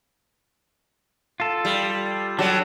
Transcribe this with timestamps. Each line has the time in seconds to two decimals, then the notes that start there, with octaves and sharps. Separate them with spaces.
1.40 F4 A4
1.65 G3
2.39 F#3 G3 D4 A4